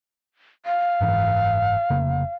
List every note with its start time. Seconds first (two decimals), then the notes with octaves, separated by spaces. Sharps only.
0.66 F5
1.01 F#1 G#2 E3
1.90 F1 C#3 A#3